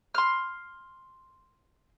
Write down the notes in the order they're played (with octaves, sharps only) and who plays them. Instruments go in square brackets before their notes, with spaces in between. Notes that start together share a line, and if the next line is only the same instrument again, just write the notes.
[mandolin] C6 F6